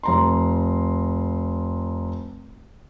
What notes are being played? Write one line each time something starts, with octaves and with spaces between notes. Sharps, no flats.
F1 A#5 C6